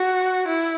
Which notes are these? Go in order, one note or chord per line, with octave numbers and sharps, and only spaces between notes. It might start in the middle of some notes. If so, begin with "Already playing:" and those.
Already playing: F#4
E4